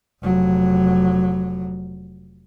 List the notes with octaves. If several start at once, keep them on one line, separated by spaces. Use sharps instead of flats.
F1 F#3